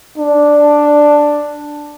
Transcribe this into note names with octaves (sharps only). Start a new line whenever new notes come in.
D4